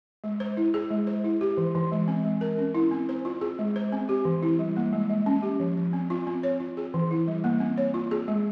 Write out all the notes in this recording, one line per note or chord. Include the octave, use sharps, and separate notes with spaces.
G#3
C5
E4
G#4
G#3
C5
E4
G4
E3
E3
G#3
C4
G#3
A#4
C#4
E4
C4
C5
F4
G#4
G#3
C5
C4
G4
E3
E4
G3
A#3
G#3
G#3
C#4
G4
F3
F3
C4
F4
C4
C#5
F4
G#4
E3
E4
G3
A#3
C4
C#5
F4
G#4
G#3